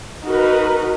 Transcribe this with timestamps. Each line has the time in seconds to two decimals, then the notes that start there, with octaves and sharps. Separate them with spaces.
0.22 D#4 F#4 A#4 B4